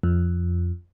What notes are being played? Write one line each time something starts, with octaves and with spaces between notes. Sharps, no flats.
F2